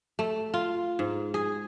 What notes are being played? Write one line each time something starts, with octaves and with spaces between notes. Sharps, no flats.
A3
F4
G#2
G#4